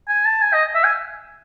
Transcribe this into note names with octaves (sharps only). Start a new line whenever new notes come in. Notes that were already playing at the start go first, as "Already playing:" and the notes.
G#5
A5
G#5
D#5
E5
G#5